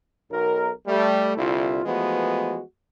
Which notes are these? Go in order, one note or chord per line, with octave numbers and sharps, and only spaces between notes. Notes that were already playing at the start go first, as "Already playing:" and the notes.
B1 A#4
G3 A3
C2 D3 E4 F4
E3 F3 G#3 A3 B3 F#4